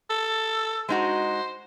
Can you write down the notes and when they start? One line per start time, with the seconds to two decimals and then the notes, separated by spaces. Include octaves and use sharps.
0.10 A4
0.89 G#3 D#4 F#4 C5